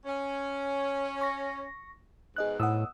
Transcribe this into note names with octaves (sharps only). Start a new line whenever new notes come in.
C#4
C#6 A#6
G#2 B2 G#4 D#5 F#6
A2 F#5 D#6 E6